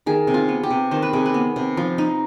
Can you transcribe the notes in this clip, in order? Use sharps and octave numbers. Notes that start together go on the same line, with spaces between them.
D#3 G#4
C3
F4
B3
G4
C3
D#3 C5
B4
C3 G#4
B4
B3
C3
F3
D#4